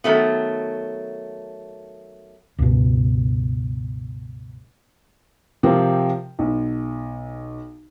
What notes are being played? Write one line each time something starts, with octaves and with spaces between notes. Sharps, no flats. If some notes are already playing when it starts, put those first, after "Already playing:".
D#3 F#3 A3 B3
C#2 G2 B2
C3 F3 C4 G4 A#4
B1